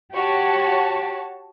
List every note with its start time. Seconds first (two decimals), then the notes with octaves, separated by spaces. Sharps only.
0.14 F#4 G4 C#5 A5